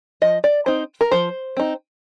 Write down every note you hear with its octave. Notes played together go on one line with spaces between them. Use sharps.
F3 D#5
D5
C4 D#4 C5
A#4
F3 C5
C4 D#4